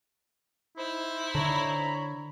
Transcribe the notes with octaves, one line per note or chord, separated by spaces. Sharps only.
D#4 E4 C5
D3 C#5 A#5 B5